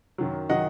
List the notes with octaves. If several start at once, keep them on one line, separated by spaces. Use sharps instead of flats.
F#2 D#3 F#3
D#3 F#3 D#5 F#5